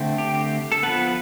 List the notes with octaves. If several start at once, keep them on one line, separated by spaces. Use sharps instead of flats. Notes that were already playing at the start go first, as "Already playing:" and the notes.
Already playing: D3 A3 C4
G4
A4
F3 B3 B4